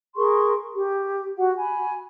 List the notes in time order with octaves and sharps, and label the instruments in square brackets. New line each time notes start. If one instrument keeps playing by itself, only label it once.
[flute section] G#4 A#4 C6 C#6
G4
F#4 F#5
G#5 B5